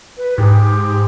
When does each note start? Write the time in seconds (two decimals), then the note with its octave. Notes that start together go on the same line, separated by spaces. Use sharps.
0.17 B4
0.38 G#2 G4